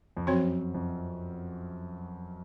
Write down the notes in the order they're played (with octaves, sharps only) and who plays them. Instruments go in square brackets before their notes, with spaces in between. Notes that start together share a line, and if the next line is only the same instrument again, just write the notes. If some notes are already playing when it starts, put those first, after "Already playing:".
[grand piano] F2
[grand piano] F#2 [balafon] F3 C4 F#4 C#5
[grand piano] F2